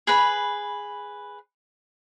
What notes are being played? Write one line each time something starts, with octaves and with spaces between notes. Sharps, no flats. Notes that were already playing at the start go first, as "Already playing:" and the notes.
G#4 B4 B5